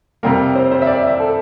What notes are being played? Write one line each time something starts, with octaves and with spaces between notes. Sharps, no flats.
F2 C3 G3 A#3 A#4
C5
C5
E5
D5
E5
A4